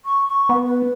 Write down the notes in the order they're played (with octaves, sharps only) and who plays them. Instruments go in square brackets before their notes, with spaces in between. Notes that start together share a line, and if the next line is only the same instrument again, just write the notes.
[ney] C#6
C#6
[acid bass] B3
[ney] B4